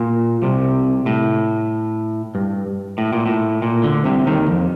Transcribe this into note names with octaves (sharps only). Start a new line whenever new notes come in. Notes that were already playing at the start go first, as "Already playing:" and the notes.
Already playing: A#2
C2 C3
A2
G2
A2
A#2
A2
A#2
D2 D3
C2 C3
D#2 D#3
F2